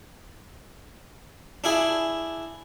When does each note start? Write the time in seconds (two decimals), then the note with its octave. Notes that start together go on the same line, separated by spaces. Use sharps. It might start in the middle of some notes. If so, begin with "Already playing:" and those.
1.64 D4 E4 G#4